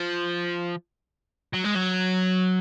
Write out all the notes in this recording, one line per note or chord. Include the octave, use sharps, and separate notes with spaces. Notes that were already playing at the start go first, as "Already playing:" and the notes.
Already playing: F3
F#3
G#3
F#3